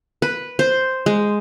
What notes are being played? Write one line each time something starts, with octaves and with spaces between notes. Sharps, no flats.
B4
C5
G#3